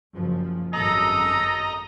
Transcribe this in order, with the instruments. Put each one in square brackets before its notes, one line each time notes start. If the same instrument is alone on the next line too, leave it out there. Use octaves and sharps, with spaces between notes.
[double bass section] F#1 F3
[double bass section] G#1 F#2 [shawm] A4 [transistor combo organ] D#5 A#5